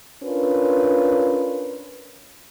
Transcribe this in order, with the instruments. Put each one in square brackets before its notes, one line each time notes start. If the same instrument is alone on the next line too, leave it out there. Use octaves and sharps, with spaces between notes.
[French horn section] C#4 D4 F4 A#4 B4